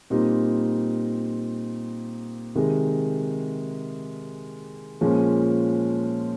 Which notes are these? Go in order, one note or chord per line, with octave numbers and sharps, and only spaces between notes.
A#2 G3 C4 D#4
C3 D#3 G#3
A#2 F3 G#3 C#4